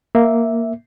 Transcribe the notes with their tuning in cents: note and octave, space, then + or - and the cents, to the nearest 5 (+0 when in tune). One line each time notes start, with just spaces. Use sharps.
A#3 +0 E5 +0